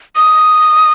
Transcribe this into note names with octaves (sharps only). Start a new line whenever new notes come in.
D#6